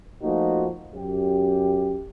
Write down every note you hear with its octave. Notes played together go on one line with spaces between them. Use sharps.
F3 A3 A#3 D#4 F4 F#4
F#2 G4